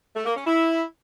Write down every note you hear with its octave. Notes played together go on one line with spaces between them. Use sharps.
A3
A#3
C#4
E4